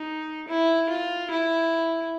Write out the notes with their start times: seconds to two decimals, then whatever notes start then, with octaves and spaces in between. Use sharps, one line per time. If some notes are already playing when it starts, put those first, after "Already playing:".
Already playing: D#4
0.48 E4
0.89 F4
1.31 E4